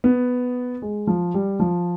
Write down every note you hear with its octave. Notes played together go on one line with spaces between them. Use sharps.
B3
G#3
F3
G3
F3